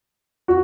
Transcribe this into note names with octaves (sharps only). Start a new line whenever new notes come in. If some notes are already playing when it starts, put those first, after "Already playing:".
F#4